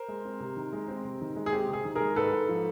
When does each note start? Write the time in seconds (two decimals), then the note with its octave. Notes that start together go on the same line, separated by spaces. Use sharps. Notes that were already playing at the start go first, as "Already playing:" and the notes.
Already playing: A#4 C5
0.08 G#3
0.25 C4
0.40 C3
0.56 D#3
0.73 G#3
0.88 C4
1.05 C3
1.21 D#3
1.36 G#3
1.46 G#4
1.53 C4 G4
1.68 C3
1.73 G#4
1.85 D#3
1.95 G#3 G#4 A#4
2.16 G#2 A4 B4
2.32 G#2
2.49 F3